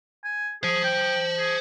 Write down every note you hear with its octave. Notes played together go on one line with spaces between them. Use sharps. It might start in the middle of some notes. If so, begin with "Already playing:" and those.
G#5
G#4 C5 A5
G5
G#4